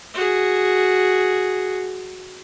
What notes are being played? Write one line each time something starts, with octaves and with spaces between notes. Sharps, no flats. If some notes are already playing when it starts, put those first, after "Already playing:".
F#4 G#4